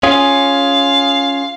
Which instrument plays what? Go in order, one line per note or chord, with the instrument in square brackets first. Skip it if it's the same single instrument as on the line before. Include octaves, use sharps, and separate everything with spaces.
[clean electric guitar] C#4 F4 G#4 [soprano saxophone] F5